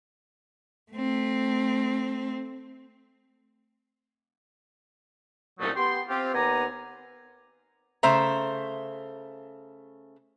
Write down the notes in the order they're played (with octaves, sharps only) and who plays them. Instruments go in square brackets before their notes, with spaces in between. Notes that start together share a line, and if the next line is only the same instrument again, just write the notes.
[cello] A3 C4
[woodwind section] C2 A#2 F#3 A3 C#4 D#4
B3 G4 G5 C6
C4 F4 G4
D#2 B3 D5 G#5 A#5
[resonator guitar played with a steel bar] C#3 A3 C5 E5 A#5